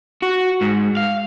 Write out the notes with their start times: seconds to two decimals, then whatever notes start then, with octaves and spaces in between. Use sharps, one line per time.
0.23 F#4
0.62 G#2
0.97 F5